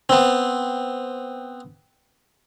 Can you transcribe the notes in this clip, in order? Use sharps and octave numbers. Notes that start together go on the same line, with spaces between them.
B3 C4